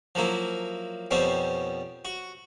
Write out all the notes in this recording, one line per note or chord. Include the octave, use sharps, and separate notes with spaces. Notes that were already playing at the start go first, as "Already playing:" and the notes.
F3 F#3 A#3 E4
F2 B2 G3 C4 C#4
F#4